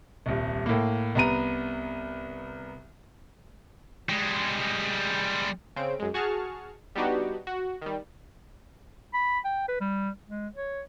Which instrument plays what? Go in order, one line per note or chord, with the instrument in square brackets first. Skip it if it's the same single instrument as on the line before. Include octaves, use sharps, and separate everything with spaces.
[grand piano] D#1 C2
A2 A#3
C2 B3 A#5 D#7
[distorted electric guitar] G3 G#3
[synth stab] C#3 C4 D7
F#2 G#3
F#4 G#4 A5 C#6 F6
G3 B3 D4 D#4 F#4 G4
F#4
D#3 G3
[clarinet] B5
G5
B4
G3
G#3
C#5